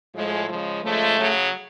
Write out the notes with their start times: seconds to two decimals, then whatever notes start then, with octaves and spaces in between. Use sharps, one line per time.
0.14 A2 F3 G#3
0.48 C#3 F3 G#3
0.82 C#3 F3 G#3 A3
1.17 C#3 F#3